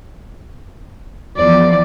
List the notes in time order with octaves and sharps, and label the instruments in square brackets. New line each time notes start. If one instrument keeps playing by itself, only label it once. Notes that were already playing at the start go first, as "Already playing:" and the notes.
[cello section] E2 F3 [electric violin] D5